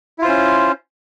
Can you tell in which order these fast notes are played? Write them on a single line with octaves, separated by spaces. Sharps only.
E4 F4 C5 C#4